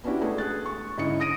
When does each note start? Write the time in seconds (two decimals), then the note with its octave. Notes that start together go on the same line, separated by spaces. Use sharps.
0.04 B3 C#4 D4 E4 F#4 G4
0.21 G#3 A3 D4 G#4
0.38 G#4 F#6 A6
0.66 C#6
0.97 G#2 D3 C#4 E4 D#5 C#7
1.20 D#6 A#6 D7 D#7